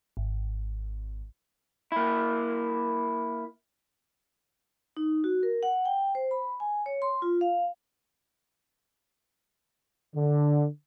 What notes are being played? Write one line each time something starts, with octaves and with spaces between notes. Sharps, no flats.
G#1
A#3 E4
D#4
F#4
A#4
F#5
G5
C5
B5
G#5
C#5
C6
F4
F5
D3